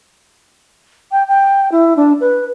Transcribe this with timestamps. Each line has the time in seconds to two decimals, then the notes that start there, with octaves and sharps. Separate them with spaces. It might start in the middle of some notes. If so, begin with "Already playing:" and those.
1.12 G5
1.28 G5
1.72 E4
1.96 D4
2.20 B4